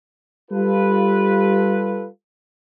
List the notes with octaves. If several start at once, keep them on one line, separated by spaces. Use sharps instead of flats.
G3 F4 A4 B4